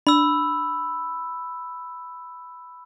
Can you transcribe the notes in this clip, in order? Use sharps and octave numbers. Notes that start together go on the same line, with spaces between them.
D4 B5 E6